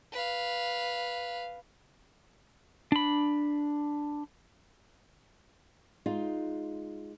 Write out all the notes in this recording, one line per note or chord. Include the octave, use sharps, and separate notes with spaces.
B4 F5
D4 B5
G#3 D#4 F4